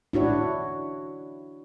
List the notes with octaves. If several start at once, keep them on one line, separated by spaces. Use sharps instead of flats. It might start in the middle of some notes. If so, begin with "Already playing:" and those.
D4 E4 F#4 C#5